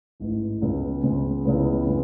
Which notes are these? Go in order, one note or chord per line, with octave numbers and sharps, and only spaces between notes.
A1 G#2 E3
C#2 C#3 G#3 B3
C#2 C#3 G#3 B3
C#2 C#3 E3 G#3 B3
C#3 E3 G#3